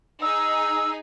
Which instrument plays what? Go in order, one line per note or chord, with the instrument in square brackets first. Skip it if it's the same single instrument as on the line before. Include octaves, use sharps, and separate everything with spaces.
[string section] D#4 G#4 [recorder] E6